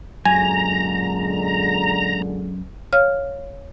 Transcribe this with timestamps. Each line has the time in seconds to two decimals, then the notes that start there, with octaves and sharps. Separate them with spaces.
0.25 F#2 A#2 D3 G#3 G#5 A#5
2.93 C#5 F5 F6